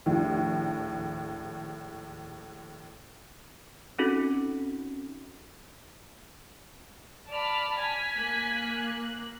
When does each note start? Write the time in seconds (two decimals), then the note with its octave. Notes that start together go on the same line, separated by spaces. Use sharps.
0.06 A#1 D#2 A2
3.98 C4 C#4 D#4 F#4 A4
7.29 D5 A5 B5 F6
7.78 G#5 B6
8.16 A#3 F#6